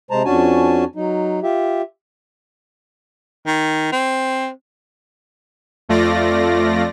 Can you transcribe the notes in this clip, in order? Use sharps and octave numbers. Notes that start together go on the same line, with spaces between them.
C3 G#3 C5 A5 A#5
F2 C#4 D4 F#4 G#5 A5
F#3 D#4
F4 G4 E5
D#3
C4
F2 A3 F4 D5 A#6